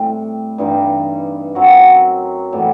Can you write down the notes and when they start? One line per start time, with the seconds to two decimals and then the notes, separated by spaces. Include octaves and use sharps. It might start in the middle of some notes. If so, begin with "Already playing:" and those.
Already playing: A2 G3 C4
0.58 G2 E3 G3 D#4
1.55 F#2 F#3 C4 F#4
2.53 A2 E3 G3 B3